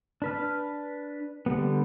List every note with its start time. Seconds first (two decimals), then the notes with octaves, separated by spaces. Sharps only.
0.22 D4 B4 F6
1.46 D3 G3 B3